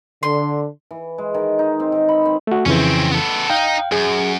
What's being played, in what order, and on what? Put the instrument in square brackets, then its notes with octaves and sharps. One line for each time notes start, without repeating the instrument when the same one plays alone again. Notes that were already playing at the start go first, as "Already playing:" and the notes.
[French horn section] D3 [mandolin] C6
[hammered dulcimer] E3
G#3
D#3
D#4
C4
D#3
B5
C4
[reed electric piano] A3 F#4
[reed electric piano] F2 C#3 E3 [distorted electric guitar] C4 C#4
[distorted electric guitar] B3 A4
[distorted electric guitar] D#4 [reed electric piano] F5 G5
[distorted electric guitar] F#2 [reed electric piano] G#4